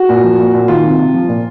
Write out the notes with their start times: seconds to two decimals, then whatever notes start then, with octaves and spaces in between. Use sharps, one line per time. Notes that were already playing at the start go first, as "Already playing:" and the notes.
Already playing: F#4
0.09 A#2
0.24 F3
0.39 A#2
0.54 A#2
0.68 D#3 F4
0.84 C3
0.99 C3
1.14 F3
1.28 A#2